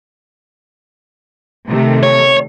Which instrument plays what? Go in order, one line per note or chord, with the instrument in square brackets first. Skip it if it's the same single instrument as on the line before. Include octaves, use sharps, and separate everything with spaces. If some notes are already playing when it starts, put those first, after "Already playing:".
[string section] C3 D#3 A3
[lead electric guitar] C#5